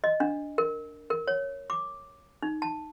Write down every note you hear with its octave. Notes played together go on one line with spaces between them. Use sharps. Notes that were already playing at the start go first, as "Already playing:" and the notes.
D#5
D4
A#4
A#4
C#5
D6
D#4
A5